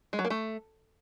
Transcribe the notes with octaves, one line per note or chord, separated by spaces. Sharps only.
G#3
F#3
A#3
A3